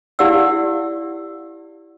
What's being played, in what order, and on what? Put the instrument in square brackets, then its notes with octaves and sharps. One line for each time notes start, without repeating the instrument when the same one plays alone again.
[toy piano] E4 G4 D5 F5 F#5 E6